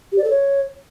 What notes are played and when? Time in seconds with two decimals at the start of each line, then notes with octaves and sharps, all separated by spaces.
0.12 G4
0.18 D5
0.24 A4
0.30 C#5